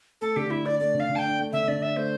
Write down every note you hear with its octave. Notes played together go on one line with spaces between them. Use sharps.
A3 A4
D3 G4
D3 E4
D4 D5
A3 D5
D3
F5
D3
A5
G5
D4
A3
D3 E5
D3 D5
D4 E5
A3 C5